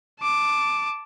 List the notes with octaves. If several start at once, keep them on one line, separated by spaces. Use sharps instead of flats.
A5 D6